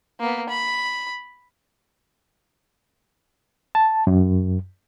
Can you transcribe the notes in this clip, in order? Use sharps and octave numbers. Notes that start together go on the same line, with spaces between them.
A#3 B3
B5
A5
F#2